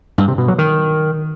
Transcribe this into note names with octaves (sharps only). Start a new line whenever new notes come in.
G2
C3
B2
F#3
D#3